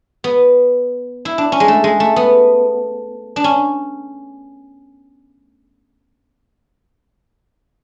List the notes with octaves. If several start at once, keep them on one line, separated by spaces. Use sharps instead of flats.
B3
E4
D4
C#4
G#3
A3
G#3
A3
B3
D4
C#4